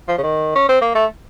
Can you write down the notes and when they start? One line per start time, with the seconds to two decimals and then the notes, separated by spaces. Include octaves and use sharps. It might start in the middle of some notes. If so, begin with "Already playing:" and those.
0.08 F3
0.18 C#3
0.23 D#3
0.55 C#4
0.69 C4
0.81 A#3
0.95 A3